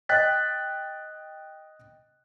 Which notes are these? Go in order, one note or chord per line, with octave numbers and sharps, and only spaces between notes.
D#5 G5 F#6 A6 B6